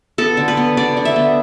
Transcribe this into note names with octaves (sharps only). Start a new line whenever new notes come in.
B3 A4
D3
B4
B3
D3 D5
D3
E5
B3